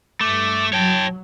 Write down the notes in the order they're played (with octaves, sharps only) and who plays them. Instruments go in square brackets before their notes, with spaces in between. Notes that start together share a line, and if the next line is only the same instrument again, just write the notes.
[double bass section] G2 [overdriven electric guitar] A3 [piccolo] D6
[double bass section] F#3 [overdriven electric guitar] C#5 G5 [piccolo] A5